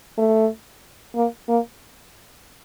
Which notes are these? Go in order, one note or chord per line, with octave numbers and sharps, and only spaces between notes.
A3
A#3
A#3